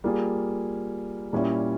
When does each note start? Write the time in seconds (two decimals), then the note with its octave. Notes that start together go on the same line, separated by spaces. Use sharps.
0.04 G3 A#3 F4 G#4
1.33 A#2 G3 C#4 E4